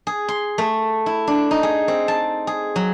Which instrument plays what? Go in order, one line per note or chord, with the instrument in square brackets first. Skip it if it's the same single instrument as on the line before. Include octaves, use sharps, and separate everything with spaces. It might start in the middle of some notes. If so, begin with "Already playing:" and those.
[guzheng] G#4
C6
A3
E4
D4
D#4
G#4
C4
A5
G#4
F#3